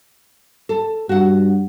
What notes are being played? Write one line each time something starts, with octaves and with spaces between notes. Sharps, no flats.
A4
G2 F#4 F#5